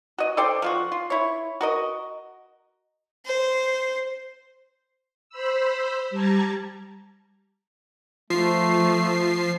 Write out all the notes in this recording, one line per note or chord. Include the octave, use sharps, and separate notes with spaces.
F#4 D#5
A4 C5 D5 G5
F3 F4 F#4
F4
E4 C#5
F#4 A#4 D#5
C5
C5 B5 E6
G3 A5 A#5 G#6
F3 A3 C7